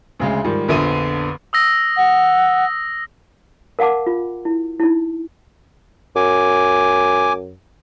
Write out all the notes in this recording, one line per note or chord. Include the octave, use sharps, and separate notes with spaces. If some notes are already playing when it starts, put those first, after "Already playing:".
D2 C#3 G#3
G#2 D#3 F3 G3
A#1 F2 D3 B3 D#7
D#6 E6 A#6
F#5
A#4 F5 F#5 A5 D6
F4
E4
D#4 E4
F#2 G#5 D6